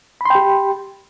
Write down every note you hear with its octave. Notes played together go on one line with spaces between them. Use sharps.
G4 G5 B5 C6